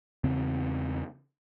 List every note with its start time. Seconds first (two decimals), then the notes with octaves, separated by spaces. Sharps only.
0.24 E2 C#3 C4